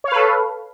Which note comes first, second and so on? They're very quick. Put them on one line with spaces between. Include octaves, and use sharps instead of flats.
C#5 F5 B4 A4